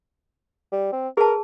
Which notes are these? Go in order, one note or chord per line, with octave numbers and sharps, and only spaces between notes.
G3
C4
G#4 A#4 B4 A5